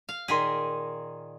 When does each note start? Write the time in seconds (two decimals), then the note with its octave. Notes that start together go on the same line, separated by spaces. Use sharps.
0.09 F5
0.28 A#2 D#3 G#4 C6 B6